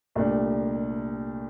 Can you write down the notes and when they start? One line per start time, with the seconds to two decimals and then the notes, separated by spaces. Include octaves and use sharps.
0.15 C2 A#2 A3 D4 G4